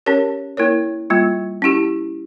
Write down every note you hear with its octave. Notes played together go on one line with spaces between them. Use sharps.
C#4 G4 A#4 C#5
A#3 E4 A#4 C#5
G3 A#3 F4
C#4 E4 G4